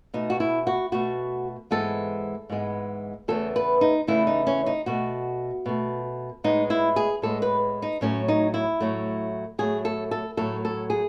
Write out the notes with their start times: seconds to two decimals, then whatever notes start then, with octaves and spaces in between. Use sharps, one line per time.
0.14 B2 A3 D#4
0.30 F#4
0.40 E4
0.67 F#4
0.92 B2 A3 F#4
1.71 G#2 E3 G#3 B3 A4
2.50 G#2 E3 G#3 B3
3.28 E2 C#3 E3 A3 A4
3.56 B4
3.81 D#4
4.07 E2 C#3 E3 A3 E4
4.27 D#4
4.47 C#4
4.66 D#4
4.86 B2 A3 F#4
5.66 B2 A3
6.44 A2 G#3 B3 D#4
6.70 E4
6.96 G#4
7.22 A2 G#3 B3 A4
7.42 B4
7.82 D#4
8.01 A2 F#3 A3 C#4
8.28 D#4
8.54 E4
8.80 A2 F#3 A3
9.58 A2 F#3 A3 G#4
9.85 A4
10.11 A4
10.37 A2 F#3 A3 A4
10.65 A4
10.90 G#4